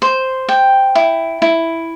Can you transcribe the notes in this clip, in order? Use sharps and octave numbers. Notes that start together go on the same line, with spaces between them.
C5
G5
E4
E4